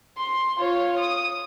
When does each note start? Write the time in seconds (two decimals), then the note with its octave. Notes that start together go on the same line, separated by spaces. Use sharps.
0.17 C6
0.58 F4 C#5
0.98 D#6